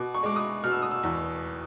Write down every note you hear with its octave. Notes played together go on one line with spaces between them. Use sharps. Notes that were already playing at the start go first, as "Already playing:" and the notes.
Already playing: B2 D6
C#6
G#3 D6
D#6
B2 F6
E6
D#6
E6
E2